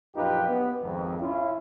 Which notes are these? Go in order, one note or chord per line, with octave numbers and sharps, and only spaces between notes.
A#1 F#2 D#4 F4 G4 B4
B3
G#1 F2
C#4 E4 F4